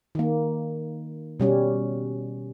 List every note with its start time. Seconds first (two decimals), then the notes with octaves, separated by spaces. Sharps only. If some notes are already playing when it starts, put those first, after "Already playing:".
0.15 D#3 A#3
1.40 B2 G3 C#4